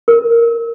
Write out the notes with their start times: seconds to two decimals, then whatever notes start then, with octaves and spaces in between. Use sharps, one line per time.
0.08 A#4